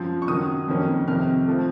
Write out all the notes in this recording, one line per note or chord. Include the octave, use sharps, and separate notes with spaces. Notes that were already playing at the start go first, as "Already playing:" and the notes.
Already playing: F#2 F3 C4
C#6
F#2 D#3 F#3 D#6
F2 D#3 A#3 C#4
F2 C3 D#3 F6
F3 A3